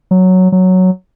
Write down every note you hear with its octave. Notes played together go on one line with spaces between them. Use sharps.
F#3
F#3